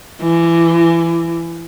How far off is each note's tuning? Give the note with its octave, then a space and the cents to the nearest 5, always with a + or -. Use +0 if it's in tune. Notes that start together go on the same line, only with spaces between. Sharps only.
E3 +25